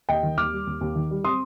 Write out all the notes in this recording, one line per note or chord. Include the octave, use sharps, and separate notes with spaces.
D#2 D#5 G5
D#3
D#2 D6 F6
G3
D#2
D#2
D#3
G3
C4 C6 D#6